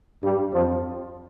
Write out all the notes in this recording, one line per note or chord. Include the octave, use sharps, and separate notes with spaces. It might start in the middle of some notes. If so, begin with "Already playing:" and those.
G2 G3
F2 F3